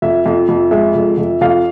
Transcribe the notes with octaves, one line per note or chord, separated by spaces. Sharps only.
F2 E5
F2
F2
G#3 E5
F2
F2
F2 F5